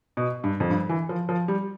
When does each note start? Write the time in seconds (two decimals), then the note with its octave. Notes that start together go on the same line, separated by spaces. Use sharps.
0.17 B2
0.44 G2
0.60 F2
0.70 G2
0.89 E3
1.09 F3
1.29 F3
1.48 G3